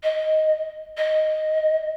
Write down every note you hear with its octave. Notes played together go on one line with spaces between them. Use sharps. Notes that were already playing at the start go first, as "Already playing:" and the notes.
D#5
D#5